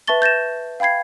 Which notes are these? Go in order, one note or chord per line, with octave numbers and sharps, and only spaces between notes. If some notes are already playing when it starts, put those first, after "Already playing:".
B4 E5 A5 C#6 A6 G7
G6 A6 A#6 E7
F5 G5 B5 G#6 C7